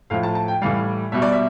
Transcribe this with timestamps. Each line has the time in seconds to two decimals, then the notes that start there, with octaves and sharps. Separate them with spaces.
0.10 A2 F3 F5
0.23 A5
0.35 A5
0.48 G5
0.61 A2 E3 G3 F5
1.12 B2 G3 E5
1.22 D5
1.32 E5